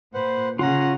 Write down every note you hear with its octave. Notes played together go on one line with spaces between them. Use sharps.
A#2 B4 C5 F#5
C#3 C#4 F4 F#5 A#5